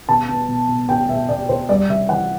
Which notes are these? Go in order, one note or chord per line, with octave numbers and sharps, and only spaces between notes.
B2 A5
B3
B2
B2
B2 G5
B2 E5
B2 D5
B2 C5
G3 D5
C3 E5
E3 F#5